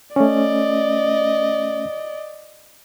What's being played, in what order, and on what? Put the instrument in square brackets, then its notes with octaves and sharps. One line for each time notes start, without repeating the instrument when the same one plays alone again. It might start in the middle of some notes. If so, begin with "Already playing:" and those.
[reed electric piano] A3 C#4 [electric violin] D5 D#5